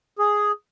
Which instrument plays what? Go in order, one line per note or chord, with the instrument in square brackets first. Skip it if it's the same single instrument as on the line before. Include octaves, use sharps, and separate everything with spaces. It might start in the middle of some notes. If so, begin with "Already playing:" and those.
[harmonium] G#4